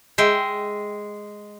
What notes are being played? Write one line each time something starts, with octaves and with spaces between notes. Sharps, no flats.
G#3 E5 G5